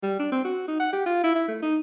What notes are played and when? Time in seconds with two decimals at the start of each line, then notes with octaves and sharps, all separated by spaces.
0.03 G3
0.19 D4
0.32 C4
0.44 F#4
0.68 D#4
0.80 F#5
0.93 G4
1.06 F4
1.24 E4
1.35 E4
1.48 A3
1.62 D#4